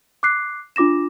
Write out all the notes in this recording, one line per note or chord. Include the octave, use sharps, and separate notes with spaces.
D6 F#6 C7
D4 F4 D6 A#6 E7